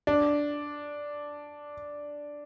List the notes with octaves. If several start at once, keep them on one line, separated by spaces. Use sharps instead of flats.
D4